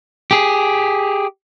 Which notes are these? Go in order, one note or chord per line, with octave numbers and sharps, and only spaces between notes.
G4 G#4